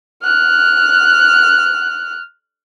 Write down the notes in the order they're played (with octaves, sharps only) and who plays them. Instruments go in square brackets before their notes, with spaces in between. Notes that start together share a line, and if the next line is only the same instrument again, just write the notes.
[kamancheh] F6 F#6